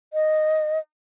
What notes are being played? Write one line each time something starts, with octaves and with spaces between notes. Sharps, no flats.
D#5